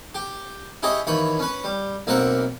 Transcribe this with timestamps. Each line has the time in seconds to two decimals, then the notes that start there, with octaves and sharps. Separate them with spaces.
0.15 G4
0.83 E4 G4 G#4 C#5 D#5
1.07 D#2 E3 C#5 B5
1.39 C#4 B4
1.64 G3
2.07 B1 A#3 C4 A#4 E5 F#5